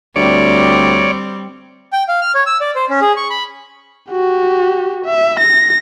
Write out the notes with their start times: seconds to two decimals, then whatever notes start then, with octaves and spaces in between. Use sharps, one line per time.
0.16 D2 G3 C4 C#5 D5
1.93 G5
2.08 F5
2.21 F6
2.35 C#5
2.46 E6
2.60 D5
2.76 C5
2.90 C#4
3.01 G#4
3.17 C#6
3.30 B5
4.11 F#4 G4
5.05 E5
5.39 A#6